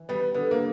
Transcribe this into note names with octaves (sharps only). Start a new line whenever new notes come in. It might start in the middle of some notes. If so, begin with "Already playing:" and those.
Already playing: E3
G3 B3
D3 B3
A#3